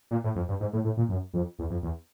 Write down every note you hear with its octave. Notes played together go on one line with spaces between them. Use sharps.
A#2
A2
F2
G2
G#2
A2
A2
A#2
F#2
F2
E2
F2
E2